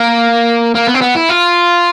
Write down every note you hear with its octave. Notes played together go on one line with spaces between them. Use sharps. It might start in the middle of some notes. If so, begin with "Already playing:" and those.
Already playing: A#3
A#3
B3
C4
B3
E4
F4